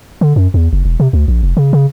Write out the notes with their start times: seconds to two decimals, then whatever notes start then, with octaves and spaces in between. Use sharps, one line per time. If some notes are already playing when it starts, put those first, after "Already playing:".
0.21 D3
0.36 F#2
0.54 E2
0.73 F#1
0.85 E1
1.00 C3
1.13 D2
1.28 A#1
1.43 F1
1.57 C#3
1.73 C#3